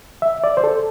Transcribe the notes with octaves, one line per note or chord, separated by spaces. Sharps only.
E5
D5
C5
A4